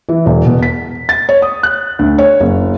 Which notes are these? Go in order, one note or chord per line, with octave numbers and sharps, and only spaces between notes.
E3
E1
B2
B6
A6
C#5
D#6
F#6
D2
C#5
F#1